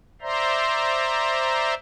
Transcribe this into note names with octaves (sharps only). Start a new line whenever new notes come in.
C5 D5 E5 A#5 C6